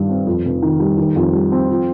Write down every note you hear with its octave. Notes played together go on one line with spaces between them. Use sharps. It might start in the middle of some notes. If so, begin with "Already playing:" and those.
Already playing: G2 D#3 G3
C4
F2
F1
D#3
G3
D#3
F2
G3
C4
F3